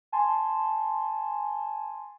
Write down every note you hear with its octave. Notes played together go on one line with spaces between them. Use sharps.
G#5 A5 C6